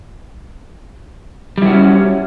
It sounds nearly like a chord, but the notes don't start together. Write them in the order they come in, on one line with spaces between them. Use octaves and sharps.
G3 E4 F#4 C#4